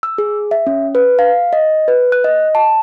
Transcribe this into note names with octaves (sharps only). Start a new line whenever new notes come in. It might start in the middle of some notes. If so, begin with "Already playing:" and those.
E6
G#4
E5
C#4
B4
F5
D#5
B4
F#6
D#5
A5